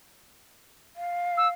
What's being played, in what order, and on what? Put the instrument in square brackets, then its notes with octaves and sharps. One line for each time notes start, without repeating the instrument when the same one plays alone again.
[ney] F5
[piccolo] E6